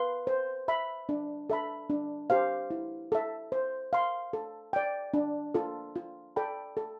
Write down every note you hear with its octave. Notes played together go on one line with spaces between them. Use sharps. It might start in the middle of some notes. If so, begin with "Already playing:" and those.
Already playing: B4 F5 C6
C5
E5 B5
D4
A4 E5 B5
D4
G4 C5 F5
E4
A4 E5
C5
F5 C6
A4
D5 G5
D4
F4 A4
F4
A4 D5 G5 B5
A4